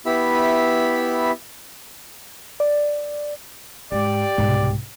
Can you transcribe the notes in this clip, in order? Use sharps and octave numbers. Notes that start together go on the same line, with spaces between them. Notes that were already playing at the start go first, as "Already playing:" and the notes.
B3 E4 G4 E5 B5
D5
G#2 G4 D5
C2 G#2 B2